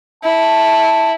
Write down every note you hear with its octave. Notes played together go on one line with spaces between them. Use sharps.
E4 A5